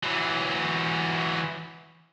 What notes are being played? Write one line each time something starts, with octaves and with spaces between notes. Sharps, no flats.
E3 F#3